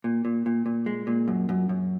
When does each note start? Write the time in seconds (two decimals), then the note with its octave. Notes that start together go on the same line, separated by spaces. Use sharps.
0.04 A#2
0.25 A#2
0.46 A#2
0.66 A#2
0.86 G#3
1.07 A#2
1.28 F#2
1.49 F#2
1.69 F#2